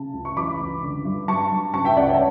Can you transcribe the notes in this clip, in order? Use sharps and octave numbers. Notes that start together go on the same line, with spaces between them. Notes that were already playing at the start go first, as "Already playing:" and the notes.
Already playing: C#3 A5
C#2
C#6
E3 B5 D6
C#2
D3
G2
G3 A5 C#6
G2
C#3 A5 C#6
E5 G5
C#2 D5 F#5
C#5 E5
A5